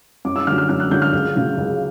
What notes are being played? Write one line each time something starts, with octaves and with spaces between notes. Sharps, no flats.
F#2 D6
E6
D3 F#3 F6
F6
F#2 F6
F#6
D3 F#3 G6
F6
C#2
C#3 F#3
C#2